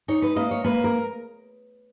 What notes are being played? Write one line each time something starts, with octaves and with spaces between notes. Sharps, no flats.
D#4 C#5
B4
A#3 D#5
C#5
A#3 B4
A#4